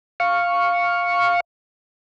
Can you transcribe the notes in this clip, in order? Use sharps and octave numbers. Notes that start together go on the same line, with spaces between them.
F5 C#6